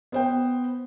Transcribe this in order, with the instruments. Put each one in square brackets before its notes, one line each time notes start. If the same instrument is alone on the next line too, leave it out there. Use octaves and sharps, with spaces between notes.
[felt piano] B3 C5 G5